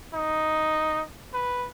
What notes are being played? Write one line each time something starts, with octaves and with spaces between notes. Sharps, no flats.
D#4
B4